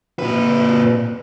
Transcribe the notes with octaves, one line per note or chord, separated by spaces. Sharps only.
A#2 B4